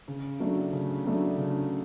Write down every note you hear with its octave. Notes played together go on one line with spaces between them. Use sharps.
C#3
F#3 A3 D4
C#3
F#3 A3 D4
C#3